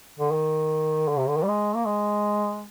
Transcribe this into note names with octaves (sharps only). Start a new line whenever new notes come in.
D3
D#3
D3
C3
D3
D#3
G3
G#3
A#3
G#3